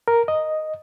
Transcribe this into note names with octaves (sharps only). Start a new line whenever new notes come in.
A#4
D#5